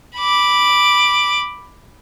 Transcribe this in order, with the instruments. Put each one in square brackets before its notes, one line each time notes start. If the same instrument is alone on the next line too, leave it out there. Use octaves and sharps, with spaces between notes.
[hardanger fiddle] B5 D6